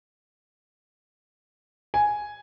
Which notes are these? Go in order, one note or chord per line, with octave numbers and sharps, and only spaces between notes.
G#5